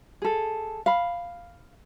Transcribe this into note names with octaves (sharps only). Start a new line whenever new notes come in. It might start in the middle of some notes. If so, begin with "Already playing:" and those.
G#4 A4
F5 B5